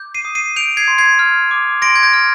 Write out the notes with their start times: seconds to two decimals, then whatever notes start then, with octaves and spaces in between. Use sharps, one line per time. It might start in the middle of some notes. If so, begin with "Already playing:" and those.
Already playing: D6 G6
0.14 C7 D#7
0.25 D#6
0.35 C7 D#7
0.56 G6 D7 F7
0.77 G#6 C7
0.88 C6
0.98 G#6 C7
1.19 F6
1.51 D6
1.82 C6 A#6 D7
1.96 G#6
2.03 G6 A#6
2.13 F6